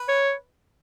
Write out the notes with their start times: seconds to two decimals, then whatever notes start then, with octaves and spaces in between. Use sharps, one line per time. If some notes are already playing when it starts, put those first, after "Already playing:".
Already playing: B4
0.09 C#5